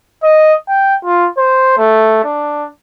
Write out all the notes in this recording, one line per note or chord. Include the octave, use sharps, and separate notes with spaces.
D#5
G5
F4
C5
A3
D4